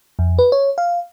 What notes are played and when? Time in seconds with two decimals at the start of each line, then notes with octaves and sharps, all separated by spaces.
0.19 F2
0.39 B4
0.52 C#5
0.78 F5